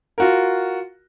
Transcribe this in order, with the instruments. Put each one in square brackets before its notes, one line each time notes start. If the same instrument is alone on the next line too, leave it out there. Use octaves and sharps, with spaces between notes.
[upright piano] F4 F#4 A#4